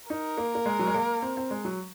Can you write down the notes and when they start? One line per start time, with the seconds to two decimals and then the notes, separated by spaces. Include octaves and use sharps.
0.10 D#4 A#4
0.38 A#3
0.55 A#3
0.66 G#3
0.79 F#3
0.87 G#3
0.95 A#3
1.22 C4
1.37 C4
1.51 G#3
1.65 F#3